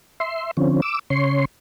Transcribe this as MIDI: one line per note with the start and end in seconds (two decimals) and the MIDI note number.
0.20 0.51 76
0.20 0.51 84
0.57 0.81 50
0.57 0.81 53
0.57 0.81 60
0.57 0.81 61
0.82 0.99 86
0.82 0.99 88
1.10 1.45 49
1.10 1.45 73
1.10 1.45 84